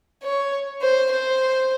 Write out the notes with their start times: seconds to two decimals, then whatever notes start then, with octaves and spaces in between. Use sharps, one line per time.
0.23 C#5
0.82 C5
1.11 C5